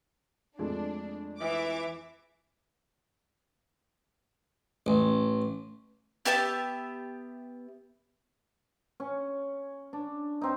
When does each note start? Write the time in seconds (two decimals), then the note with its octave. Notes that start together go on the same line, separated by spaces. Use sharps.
0.59 F2 G#3 A3 D4
1.40 E3 E5 D6
4.86 A1
6.25 B3 G4 E5 A5
9.00 C#4
9.93 D4
10.41 C4 D#4